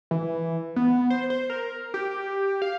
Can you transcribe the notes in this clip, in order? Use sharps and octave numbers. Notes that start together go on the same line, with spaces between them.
E3
B3
C5
C5
A#4
G4
F5